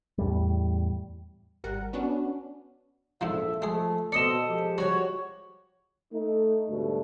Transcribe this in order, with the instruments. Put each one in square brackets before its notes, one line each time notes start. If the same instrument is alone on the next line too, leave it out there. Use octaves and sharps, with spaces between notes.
[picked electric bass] E2 A2 G3
[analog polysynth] G#1 G3 A#4 F#5
B3 C#4 D4 F#4
[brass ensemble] A#1 A4 E5 [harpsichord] E2 G#2 F3
[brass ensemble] F3 A3 [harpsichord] G#3 G#4
[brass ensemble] B2 C4 [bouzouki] A4 D#5 [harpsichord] D5 D#6 [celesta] C#7 E7
[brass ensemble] F3 G#3 G4
[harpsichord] G3 [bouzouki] F#4 C#5
[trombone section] A3 D#4
D2 G#2 B2 G3 A3